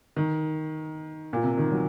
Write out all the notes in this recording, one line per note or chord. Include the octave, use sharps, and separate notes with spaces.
D#3
A#2
C3
D#3
F#3